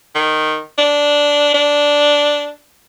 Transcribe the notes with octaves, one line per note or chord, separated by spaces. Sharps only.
D#3
D4
D4